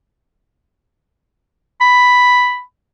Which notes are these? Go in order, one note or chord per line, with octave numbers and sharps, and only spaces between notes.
B5